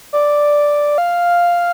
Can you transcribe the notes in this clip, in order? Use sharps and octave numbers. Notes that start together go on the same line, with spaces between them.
D5
F5